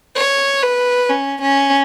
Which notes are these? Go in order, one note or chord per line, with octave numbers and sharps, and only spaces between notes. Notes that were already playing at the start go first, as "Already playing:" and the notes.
C#5
B4
C#4
C#4